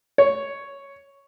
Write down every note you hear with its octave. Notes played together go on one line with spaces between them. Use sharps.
C#5